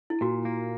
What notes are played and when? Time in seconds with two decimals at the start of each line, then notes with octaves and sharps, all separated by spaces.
0.10 E4
0.21 A#2 F#4
0.45 A#3